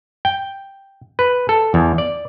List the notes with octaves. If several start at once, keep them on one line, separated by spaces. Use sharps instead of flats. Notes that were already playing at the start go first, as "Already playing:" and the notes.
G5
B4
A4
E2
D5